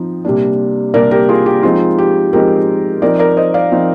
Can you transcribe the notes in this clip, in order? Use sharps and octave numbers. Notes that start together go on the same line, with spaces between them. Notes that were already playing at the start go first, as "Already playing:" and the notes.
Already playing: F3 C4 D#4
C3 G3 A#3 D4
C3 G3 A#3 D4 A#4 D5
G4 A#4
F4 G#4
G4
F3 G#3 C4 D#4 F4
G4
F3 G#3 C4 D#4 G4 A#4
F3 C4 D#4 A#4 D5
A#4 D5
C5 D#5
D5 F5
F3 C4 D#4